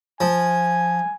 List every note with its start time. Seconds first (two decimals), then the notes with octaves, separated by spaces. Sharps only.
0.21 F3 G#5